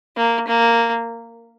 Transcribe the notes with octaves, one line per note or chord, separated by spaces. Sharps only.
A#3
A#3